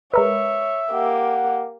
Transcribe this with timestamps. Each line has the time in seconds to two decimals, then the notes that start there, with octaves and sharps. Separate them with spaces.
0.14 G#3 A#4 B4 C#5 E5
0.91 A#3 G4 F#5